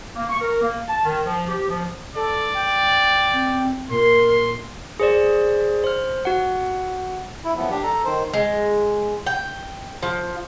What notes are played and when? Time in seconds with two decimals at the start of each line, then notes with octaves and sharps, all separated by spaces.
0.16 A#3
0.29 C#6
0.41 A#4
0.61 A#3
0.88 A5
1.05 D#3
1.25 F3
1.49 G4
1.68 F3
2.16 A4 D5
2.55 G5
3.33 C4
3.90 A#2 A#4 C6
5.00 G#4 C5 D5
5.84 C5 F6
6.25 F#4 F#5
7.45 E4
7.57 F#2 A2 E3 F3 B3
7.70 D4 G4
7.83 A4 A#5
8.05 D#3 C5
8.33 G#3
9.27 G5
10.02 F3